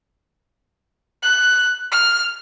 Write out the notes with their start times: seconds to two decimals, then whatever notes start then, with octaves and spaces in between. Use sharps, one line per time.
1.22 F#6
1.91 F6